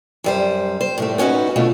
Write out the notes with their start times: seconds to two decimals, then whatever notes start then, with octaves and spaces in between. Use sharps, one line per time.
0.24 F#2 G3 C5
0.81 C5
0.98 A2 G3 A3
1.18 B3 C#4 D#4 F#4 B4
1.56 B2 D3 A3 C#4 F4